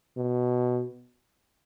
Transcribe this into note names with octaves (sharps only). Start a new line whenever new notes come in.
B2